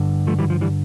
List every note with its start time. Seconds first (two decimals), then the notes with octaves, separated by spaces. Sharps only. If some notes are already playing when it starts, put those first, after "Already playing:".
Already playing: G2 D3
0.27 F3 A3
0.39 E3 G3
0.50 F3
0.61 E3 G3